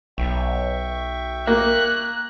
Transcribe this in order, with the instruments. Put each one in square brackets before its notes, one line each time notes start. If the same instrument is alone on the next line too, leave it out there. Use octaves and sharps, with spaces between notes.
[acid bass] B1 [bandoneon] E5 G5 C#6
[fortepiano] A#3 [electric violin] F#6